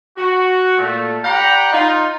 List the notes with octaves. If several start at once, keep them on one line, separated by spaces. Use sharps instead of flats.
F#4
A#2 A3
G4 D5 F#5 G5 A#5 B5
D#4 F4